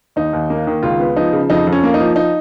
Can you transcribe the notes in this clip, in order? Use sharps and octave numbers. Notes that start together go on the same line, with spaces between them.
D#2 D#4
D#2
A#3
D#3
C#2 F4
B3
F3 D#4
C#3
F2 D#4
F2
C#4
A#3
D#4
F3
D#4